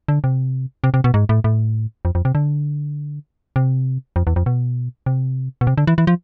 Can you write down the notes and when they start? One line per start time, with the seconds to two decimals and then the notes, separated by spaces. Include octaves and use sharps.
0.08 D3
0.24 C3
0.84 C3
0.94 C3
1.04 B2
1.14 G#2
1.29 A2
1.44 A2
2.05 F2
2.15 F2
2.25 C3
2.35 D3
3.56 C3
4.16 F2
4.27 E2
4.36 F2
4.46 B2
5.06 C3
5.61 B2
5.67 C3
5.78 D3
5.87 E3
5.98 E3
6.07 F3